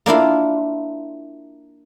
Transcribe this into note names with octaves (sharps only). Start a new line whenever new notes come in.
A#3 D4 E4 F4